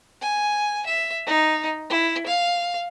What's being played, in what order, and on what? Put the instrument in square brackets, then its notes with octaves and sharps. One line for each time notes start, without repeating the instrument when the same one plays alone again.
[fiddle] G#5
E5
D#4
E4
F5